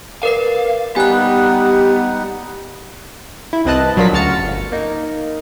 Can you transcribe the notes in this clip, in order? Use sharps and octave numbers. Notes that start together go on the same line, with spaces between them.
A#4 B4 D5 F5 C7
G3 B3 D#4 G4 F#5 G#5 F#6
E4
C2 C4 B4 D#5 A5 F#6
A#1 F#3 D4 F4 A#4 B6
D2 C#3 F#4 F6 A6 C#7
G1
A#3 D#4